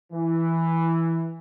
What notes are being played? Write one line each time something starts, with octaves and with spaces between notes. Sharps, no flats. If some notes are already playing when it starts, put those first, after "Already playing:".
E3